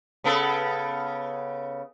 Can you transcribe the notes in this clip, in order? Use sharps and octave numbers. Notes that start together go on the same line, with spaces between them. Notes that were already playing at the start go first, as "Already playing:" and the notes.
C#3 B3 A4